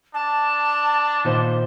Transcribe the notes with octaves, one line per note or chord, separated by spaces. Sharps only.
D4 A5
A#2 D#3 C5